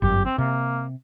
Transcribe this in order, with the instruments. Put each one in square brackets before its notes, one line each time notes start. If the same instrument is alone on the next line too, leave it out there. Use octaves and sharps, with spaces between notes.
[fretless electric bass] G1 F#2 [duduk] G4
[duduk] C4
[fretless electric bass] C3 [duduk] A#3